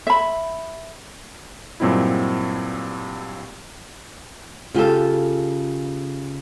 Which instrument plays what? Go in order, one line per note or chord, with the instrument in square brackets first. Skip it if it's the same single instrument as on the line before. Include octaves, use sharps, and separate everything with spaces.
[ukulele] E5 B5
[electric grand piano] G2 A#2 F#3 C4 D#4 E4
[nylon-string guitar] C#3 F4 G4 A4